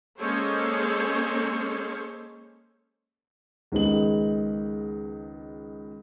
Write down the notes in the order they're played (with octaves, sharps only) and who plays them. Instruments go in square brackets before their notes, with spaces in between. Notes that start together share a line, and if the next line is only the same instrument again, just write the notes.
[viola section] G#3 A#3 C#4 A4 C5 C#5
[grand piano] C#2 D#3 G#3 B3 D#4 F#7